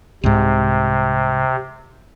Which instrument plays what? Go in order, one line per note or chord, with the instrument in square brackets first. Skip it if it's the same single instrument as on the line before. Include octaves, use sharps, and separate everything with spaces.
[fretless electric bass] C2 G#2 [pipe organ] C3